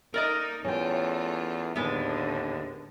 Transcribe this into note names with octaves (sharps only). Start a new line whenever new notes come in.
A#3 D#4 A#4 D5 D#5
E2 A3 C#4 F4 G5
D#2 A2 D3 G#3 B3